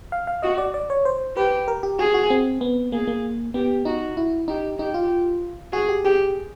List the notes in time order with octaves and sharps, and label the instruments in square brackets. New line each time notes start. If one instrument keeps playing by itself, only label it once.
[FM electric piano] F5
F5
[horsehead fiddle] F#4 [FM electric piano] D#5
[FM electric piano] D5
D5
C#5
C5
[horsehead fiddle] G4 [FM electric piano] B4
[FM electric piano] A#4
G4
[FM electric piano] F#4 [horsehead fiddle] G#4
[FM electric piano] F#4
C4
B3
[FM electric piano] A#3 [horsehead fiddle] G#4
[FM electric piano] A#3
[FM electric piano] B3 [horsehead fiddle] G4
[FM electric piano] D#4 [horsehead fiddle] F#4
[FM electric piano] E4
[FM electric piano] D#4 [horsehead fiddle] G4
[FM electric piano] D#4 [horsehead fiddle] G4
[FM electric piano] F4
[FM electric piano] F#4 [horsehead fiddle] G#4
[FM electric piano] G4
[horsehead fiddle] G4 [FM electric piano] G#4